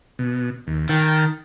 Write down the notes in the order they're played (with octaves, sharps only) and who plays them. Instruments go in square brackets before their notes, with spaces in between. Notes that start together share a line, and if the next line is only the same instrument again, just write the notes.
[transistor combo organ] B2
D#2
[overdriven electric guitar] D#3 [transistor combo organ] G5 A5